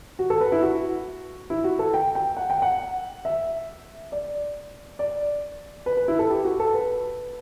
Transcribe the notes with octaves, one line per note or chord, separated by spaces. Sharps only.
F#4
A4
B4
E4
F#4
E4
F#4
A4
G5
G5
F#5
G5
F#5
E5
D5
D5
B4
B4
E4
A4
G4
F#4
A4
B4